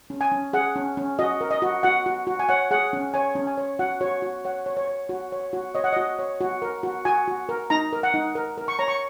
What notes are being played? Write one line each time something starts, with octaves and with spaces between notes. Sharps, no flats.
C#4
G#5
C#4
G#4 F#5
C#4
C#4
F#4 D#5
A#4
D#5
F#4
F#4 F#5
F#4
F#4
G#5
C#5 F#5
G#4 F#5
C#4
C#5 G#5
C#4
G#5
C#5
F#4 F#5
F#4 C#5
F#4
C#5 F#5
C#5
C#5
C#5
F#4
C#5
F#4
C#5 D#5
F#5
F#4 D#5
C#5
F#4
A#4
F#4
F#4 G#5
F#4
A#4
D#4 A#5
A#4
F#5
D#4
A#4
A#4
C#6
C#5 A#5
C#6